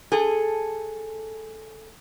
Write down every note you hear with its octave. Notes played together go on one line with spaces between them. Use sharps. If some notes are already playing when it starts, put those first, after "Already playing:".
G#4 A4